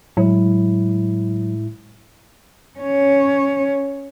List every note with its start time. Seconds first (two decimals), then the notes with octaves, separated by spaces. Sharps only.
0.17 A2 F#3 G#3 E4
2.80 C#4 C#5